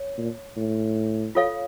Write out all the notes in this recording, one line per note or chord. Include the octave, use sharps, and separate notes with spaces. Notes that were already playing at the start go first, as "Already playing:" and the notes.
Already playing: C#5
A#2
A2
F4 A4 C#5 F5